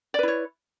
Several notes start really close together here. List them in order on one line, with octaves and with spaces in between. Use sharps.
D5 B4 E4 C#5